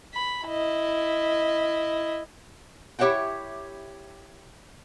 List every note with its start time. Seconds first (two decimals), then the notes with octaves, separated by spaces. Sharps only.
0.14 B5
0.46 E4 D#5
2.99 E4 G4 C#5 E5 F#5 G5